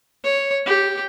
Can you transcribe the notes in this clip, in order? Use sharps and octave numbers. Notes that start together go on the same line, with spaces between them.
C#5
G4